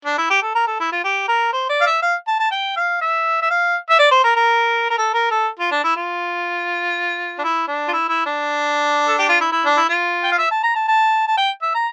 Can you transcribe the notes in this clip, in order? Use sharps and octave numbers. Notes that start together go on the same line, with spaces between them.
D4
E4
G4
A4
A#4
A4
E4
F4
G4
A#4
C5
D5
F5
E5
F5
A5
A5
G5
F5
E5
E5
F5
E5
D5
C5
A#4
A#4
A#4
A4
A#4
A4
F4
D4
E4
F4
D4
E4
D4
F4
E4
E4
D4
A4
G4
F4
E4
E4
D4
E4
F4
G5
F5
E5
A5
A#5
A5
A5
A5
G5
E5
A#5